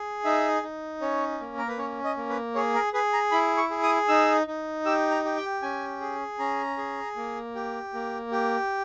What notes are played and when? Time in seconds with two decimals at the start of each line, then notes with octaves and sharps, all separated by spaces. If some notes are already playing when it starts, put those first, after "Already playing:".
Already playing: G#4
0.25 D#4 E5
0.63 D#4
1.01 C#4 C#5
1.40 A#3
1.57 A#4
1.68 B4
1.78 C#4 C#5
2.04 D#5
2.17 A#3
2.30 B4
2.55 G#4 C#5
2.74 A#4
2.93 G#4 B4
3.13 A#5
3.32 E4 B5
3.57 C#6
3.71 G#4
3.83 D#6
4.09 D#4 E6
4.47 D#4
4.86 G4 E6
5.11 A#5
5.25 G4
5.37 G5
5.62 C#4 G#5
6.01 G#4
6.39 C#4 A#5
6.78 G#4
7.16 A#3
7.55 G4
7.94 A#3
8.32 G4